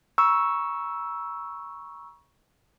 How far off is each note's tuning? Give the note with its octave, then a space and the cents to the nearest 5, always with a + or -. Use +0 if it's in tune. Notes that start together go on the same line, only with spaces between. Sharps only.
A#5 +40 C#6 +0 E6 +0